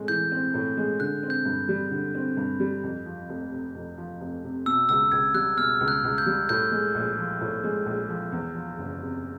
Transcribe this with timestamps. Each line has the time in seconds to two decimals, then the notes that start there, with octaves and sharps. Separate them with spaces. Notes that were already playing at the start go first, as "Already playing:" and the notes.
Already playing: A2 G#3 C4
0.08 E3 G6
0.32 C4
0.54 A2
0.77 G#3
1.00 D3 F#6
1.23 C4
1.30 G6
1.45 G2
1.68 G3
1.91 D3
2.14 C4
2.37 G2
2.60 G3
2.83 F2
3.06 F3
3.29 F1
3.51 C3
3.75 F2
3.98 F3
4.20 F1
4.43 C3
4.66 B2 E6
4.89 C#2 E6
5.12 C#2 G#6
5.34 G3 F#6
5.58 B2 F6
5.80 C#2
5.88 F#6
6.04 C#2
6.18 G6
6.26 G3
6.49 A2 G6
6.71 G#3
6.95 A#1
7.18 F3
7.41 A2
7.64 G#3
7.86 A#1
8.09 F3
8.32 E2
8.55 F3
8.78 F#1
9.01 C3